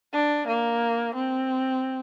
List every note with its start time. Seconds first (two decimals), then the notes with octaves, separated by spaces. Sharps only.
0.14 D4
0.48 A#3
1.15 C4